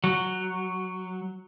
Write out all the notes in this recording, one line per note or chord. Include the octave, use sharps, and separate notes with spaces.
F#3